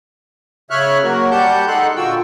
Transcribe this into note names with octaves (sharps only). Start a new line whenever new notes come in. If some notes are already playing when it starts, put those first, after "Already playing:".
C#3 C#5 E5 F6 F#6
F#3 A#3 F#4 A#4
G3 G4 F#5 A5 G6
G#3 D#4 A4 F#5 C6 F#6
A#2 D3 F4 F#4 G5 E6